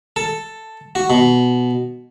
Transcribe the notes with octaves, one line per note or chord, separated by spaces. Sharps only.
A4
F#4
B2